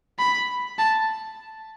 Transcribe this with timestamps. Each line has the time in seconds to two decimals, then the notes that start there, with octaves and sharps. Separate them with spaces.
0.19 B5
0.79 A5